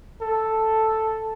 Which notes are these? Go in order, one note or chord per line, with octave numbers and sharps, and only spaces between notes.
A4